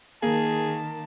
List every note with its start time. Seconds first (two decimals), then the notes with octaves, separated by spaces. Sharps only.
0.23 D#3 A#3 G#4 A5